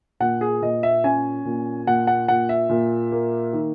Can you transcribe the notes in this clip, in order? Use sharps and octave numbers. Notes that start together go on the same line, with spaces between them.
A#2 F#5
G#4
A#2 D#5
E5
C#4 G#5
A#2
A#2 F#5
F#5
A#2 F#5
E5
A#2
A#3
D#3